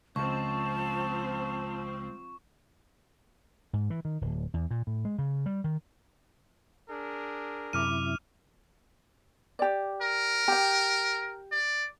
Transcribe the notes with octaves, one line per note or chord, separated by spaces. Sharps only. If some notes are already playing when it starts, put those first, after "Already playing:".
C#2 F3 C4 C5 A5 C#6
G#2
E3
D#3
D1
E2
A#2
A2
G#3
C#3
G3
D#3
D4 G#4 A#4
F#2 C3 E4 D6 F6 D#7
G4 D5
A#4
G4 G5
D5